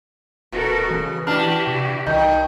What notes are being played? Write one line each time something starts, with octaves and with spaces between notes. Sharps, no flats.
D#1 B2 F#4 A4 A#4
C#3 E3
D4 E4 F#4 G4 A5 F6
C3
C2 D#3 D#4 A5 G6